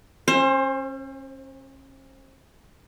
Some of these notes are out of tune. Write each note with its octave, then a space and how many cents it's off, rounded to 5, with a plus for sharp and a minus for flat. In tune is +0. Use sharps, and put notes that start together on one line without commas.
C#4 -35 C5 +25